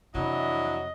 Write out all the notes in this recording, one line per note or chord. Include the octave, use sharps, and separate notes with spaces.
F2 C3 E3 F#3 D4 E4 D#5